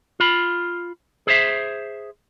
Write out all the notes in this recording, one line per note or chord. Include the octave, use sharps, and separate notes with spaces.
F4 B5
G#4 C5 E5